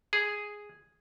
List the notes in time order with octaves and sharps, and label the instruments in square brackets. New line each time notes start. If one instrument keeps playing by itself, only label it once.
[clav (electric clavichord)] G#4